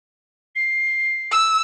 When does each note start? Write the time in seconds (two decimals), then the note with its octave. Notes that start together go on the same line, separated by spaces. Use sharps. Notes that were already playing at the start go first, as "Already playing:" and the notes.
0.55 C7
1.32 E6